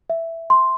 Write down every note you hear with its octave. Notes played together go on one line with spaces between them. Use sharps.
E5
C6